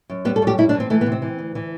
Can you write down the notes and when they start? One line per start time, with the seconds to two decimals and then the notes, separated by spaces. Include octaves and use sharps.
0.10 F#2
0.25 G3 B3
0.36 A4
0.42 F#2 G4
0.58 G3 E4
0.69 D4
0.74 E3
0.80 C4
0.90 E3 A3
1.01 B3
1.06 C3
1.12 C4
1.22 E3
1.38 D2
1.55 E3